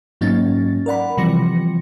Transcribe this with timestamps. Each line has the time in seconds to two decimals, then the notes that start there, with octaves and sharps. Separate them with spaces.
0.21 G#2 F#3 A#3 C#4 D#4 A6
0.86 A#4 D5 F#5 B5
1.17 C3 E3 F3 G3 A#6 C#7